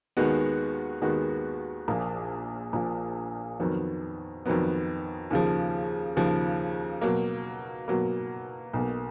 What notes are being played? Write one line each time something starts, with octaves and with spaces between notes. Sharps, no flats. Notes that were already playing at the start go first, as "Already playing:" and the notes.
D#2 D#3 G#3 B3 F#4
D#2 D#3 G#3 B3 F#4
A#1 A#2 F3 A#3
A#1 A#2 F3 A#3
F2 D#3 F#3 B3
F2 D#3 F#3 B3
D#2 C#3 F3
D#2 C#3 F3
B2 F#3 A#3
B2 F#3 A#3
B1 B2 A#3